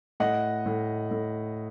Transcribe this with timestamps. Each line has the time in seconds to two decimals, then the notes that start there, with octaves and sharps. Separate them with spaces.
0.20 A2 D#5 F#5
0.66 A2
1.11 A2